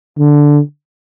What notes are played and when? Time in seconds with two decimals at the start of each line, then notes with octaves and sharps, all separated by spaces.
0.19 D3